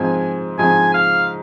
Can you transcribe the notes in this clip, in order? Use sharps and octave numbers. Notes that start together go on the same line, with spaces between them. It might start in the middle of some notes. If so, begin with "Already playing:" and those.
Already playing: G#2 F3 C4 G#5
G#2 F3 C4 G#5
F5